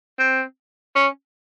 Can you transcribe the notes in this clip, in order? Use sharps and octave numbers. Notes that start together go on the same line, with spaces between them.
C4
C#4